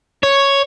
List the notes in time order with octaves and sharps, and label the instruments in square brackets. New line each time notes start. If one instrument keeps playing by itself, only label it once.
[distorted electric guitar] C#5